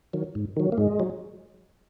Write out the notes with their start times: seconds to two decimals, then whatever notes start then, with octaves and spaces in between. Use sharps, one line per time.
0.13 D#3 F#3
0.35 G#2
0.57 D#3 F#3
0.72 A#3
0.77 G#2 G#3
1.00 F#3